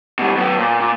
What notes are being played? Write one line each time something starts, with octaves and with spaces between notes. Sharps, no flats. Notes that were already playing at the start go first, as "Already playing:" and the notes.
B2 G3
F#2 B3
A#2
A#2